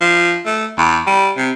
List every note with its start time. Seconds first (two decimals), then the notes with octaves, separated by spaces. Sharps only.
0.01 F3
0.45 A3
0.78 E2
1.07 G3
1.37 C3